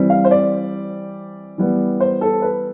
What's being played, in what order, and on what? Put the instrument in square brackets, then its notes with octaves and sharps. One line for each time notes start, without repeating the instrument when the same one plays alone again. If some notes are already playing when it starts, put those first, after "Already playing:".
Already playing: [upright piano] E3 G3 C4
F5
C5
D5
E3 G3 B3
C5
A4
B4